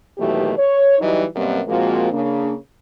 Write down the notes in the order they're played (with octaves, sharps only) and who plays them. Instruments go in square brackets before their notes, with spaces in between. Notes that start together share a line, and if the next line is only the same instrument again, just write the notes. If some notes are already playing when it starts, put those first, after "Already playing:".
[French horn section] D#2 B2 E3 F#3 A3 G4
C#5
E3 F#3 G3 D#4
F#2 B2 G3 A#3 C4
A#2 F3 G#3 A#3 C4 F#4
C#3 A#3 D4